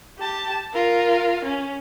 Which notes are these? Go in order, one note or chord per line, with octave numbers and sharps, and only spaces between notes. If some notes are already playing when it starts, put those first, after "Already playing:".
G4 A5
F4 A#4
C#4